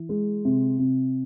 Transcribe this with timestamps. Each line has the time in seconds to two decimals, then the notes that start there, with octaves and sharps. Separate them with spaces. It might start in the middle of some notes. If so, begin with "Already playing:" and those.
Already playing: E3
0.09 G#3
0.45 C3
0.79 C3